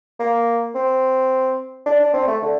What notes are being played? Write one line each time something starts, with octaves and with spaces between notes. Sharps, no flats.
A#3
C4
D4
D4
C4
A3
D3